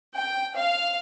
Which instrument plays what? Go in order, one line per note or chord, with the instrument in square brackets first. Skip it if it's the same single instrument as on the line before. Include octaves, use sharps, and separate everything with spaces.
[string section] G5
F5